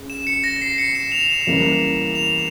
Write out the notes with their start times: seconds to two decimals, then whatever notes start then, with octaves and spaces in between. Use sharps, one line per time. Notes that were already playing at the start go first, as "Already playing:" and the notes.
Already playing: C#3 G#4
0.10 E7
0.27 C#7
0.44 A#6
0.62 C7
0.78 C#7
0.95 E7
1.12 F7
1.30 E7
1.47 E2 E3 G3 A#3 C#4
2.15 F7